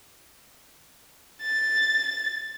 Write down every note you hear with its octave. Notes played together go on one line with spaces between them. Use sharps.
A6